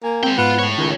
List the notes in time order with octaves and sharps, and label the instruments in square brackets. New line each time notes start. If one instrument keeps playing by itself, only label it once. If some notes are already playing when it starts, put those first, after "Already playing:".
[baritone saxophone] A#3 [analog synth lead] G#5
[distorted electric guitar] G#3 G5 [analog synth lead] C4
[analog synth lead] G#2 [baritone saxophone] B3 [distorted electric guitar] F4
[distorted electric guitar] A2 C#5
[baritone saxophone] C#2 [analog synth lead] D#3